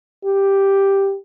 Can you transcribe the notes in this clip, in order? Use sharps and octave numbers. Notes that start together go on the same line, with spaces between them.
G4